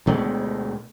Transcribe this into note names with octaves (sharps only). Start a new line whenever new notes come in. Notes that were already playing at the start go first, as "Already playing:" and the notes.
D2 B2 G#3 A3